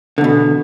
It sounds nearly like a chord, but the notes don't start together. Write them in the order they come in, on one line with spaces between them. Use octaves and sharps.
D3 E2 B2